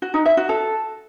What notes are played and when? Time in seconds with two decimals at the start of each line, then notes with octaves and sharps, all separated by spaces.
0.02 F#4
0.14 D#4
0.26 E5
0.37 F#4
0.49 A4